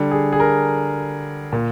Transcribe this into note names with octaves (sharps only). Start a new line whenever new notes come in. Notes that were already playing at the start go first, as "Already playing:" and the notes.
Already playing: D3 G3
G#4
G#4
A#4
A#2